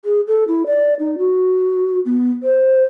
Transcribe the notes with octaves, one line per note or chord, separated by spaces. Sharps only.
G#4
A4
E4
D5
D#4
F#4
B3
C5